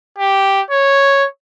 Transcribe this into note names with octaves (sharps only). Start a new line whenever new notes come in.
G4
C#5